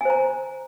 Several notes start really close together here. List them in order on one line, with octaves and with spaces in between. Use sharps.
G#5 C5 A#5